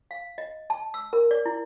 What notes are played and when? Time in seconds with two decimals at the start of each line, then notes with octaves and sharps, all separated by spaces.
0.11 F5
0.38 D#5
0.70 A5
0.94 E6
1.13 A#4
1.31 D5
1.46 E4